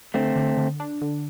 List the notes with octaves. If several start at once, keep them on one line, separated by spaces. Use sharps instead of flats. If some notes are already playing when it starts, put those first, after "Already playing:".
D3 A3 C4
D3
D3
D4
D3